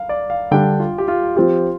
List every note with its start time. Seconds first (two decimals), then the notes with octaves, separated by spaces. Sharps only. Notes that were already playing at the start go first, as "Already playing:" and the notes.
Already playing: F5
0.09 D5
0.30 F5
0.51 D3 G3 D4 G5
0.80 F4
0.98 G4
1.08 F4
1.36 F3 C4 F4 G4